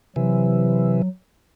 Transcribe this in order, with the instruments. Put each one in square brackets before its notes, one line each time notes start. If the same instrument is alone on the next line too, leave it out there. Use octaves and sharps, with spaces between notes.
[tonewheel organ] C3 E3 [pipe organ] F#3